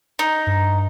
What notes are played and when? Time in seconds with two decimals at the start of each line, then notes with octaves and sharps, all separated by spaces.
0.19 D#4
0.47 G2